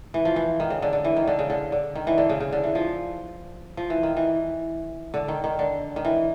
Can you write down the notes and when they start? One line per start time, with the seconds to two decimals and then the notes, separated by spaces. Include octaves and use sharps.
0.14 E3
0.25 F3
0.36 E3
0.60 D#3
0.70 C#3
0.82 D3
0.93 D3
1.04 E3
1.16 D#3
1.28 D3
1.39 C#3
1.50 D3
1.72 D3
1.95 D#3
2.07 E3
2.18 D3
2.29 C#3
2.40 C#3
2.52 D3
2.64 E3
2.75 F3
3.77 F3
3.90 E3
4.03 D#3
4.17 E3
5.14 D3
5.28 D#3
5.44 D#3
5.59 D3
5.96 D#3
6.05 E3